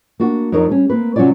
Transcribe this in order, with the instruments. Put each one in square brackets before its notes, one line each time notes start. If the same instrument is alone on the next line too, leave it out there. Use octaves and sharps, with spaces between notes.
[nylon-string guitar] A#3 D4 F#4
F2 F#3 D#4 A#4 C#5
G3 C#4
A#3 C4 B4
C3 F#3 C#4 F4 C#5 D5